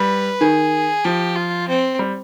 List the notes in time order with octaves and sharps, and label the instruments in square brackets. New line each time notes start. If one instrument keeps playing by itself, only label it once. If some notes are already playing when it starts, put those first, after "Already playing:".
Already playing: [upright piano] G3 [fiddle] B4
[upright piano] D#3 [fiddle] G#4
[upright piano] F3 [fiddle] G4
[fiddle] F4
C4
[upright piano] G3